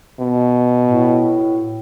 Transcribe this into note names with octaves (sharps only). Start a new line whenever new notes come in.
B2
A2